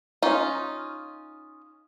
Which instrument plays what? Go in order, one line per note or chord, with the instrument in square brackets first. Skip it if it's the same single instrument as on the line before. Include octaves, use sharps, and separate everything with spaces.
[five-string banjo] C#4 D#4 F4